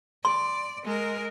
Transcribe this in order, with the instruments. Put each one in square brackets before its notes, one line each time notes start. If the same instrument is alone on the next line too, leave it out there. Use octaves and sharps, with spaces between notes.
[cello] D5 [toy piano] C6
[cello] G#3 A#4